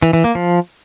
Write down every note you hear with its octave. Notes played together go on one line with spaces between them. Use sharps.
E3
E3
A#3
F3